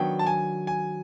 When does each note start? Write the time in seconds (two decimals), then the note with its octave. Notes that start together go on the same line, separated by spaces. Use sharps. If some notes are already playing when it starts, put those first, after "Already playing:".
Already playing: D#3 F#3 B3 D4 G5
0.19 A5
0.27 G#5
0.67 G#5